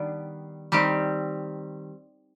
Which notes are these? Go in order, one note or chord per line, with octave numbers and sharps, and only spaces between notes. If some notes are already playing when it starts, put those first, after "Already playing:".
Already playing: D#3 G3 B3 D4
D#3 G3 C4 G4